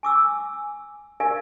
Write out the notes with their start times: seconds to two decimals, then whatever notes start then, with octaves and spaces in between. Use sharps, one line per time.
0.03 G#5 D6 E6
1.20 A#4 D5 F5 G#5